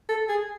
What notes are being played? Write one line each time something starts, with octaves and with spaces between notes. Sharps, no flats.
A4
G#4